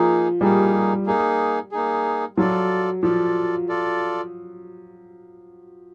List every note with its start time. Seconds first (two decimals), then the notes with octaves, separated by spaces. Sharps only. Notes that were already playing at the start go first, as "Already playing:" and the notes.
Already playing: F3 A#3 D#4 G#4
0.41 G3 A#3 D#4 G#4
1.06 A#3 D#4 G#4
1.72 A#3 D#4 G#4
2.37 F#3 F4 A4 D5
3.03 F3 F4 A4 D5
3.69 F4 A4 D5